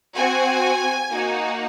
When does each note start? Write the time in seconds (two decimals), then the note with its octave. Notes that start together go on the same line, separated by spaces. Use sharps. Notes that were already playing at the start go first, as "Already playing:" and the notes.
0.15 C4 F#4 G#5
1.10 A#3 D#4 F#4